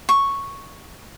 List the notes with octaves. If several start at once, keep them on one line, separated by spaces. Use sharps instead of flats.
C#6